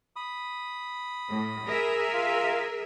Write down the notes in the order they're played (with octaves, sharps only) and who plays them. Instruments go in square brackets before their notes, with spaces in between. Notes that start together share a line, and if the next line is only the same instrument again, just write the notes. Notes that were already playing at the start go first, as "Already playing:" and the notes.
[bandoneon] B5 D#6
[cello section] A2
G#4 A#4 E5
[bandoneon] F4 F5